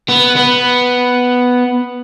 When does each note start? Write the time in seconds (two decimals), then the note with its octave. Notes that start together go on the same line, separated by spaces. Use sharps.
0.09 B3
0.37 B3